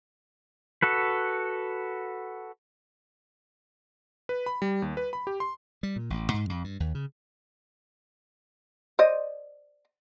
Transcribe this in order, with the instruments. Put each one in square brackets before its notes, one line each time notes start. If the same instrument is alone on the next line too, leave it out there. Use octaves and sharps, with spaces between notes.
[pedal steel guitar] F#4 A4 B4
[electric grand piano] B4
B5
G3
D#2
B4
B5
G4
C6
[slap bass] G3
A#2
A1
G#2
F2
G2
D#2
C#3
[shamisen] C5 D5 D#5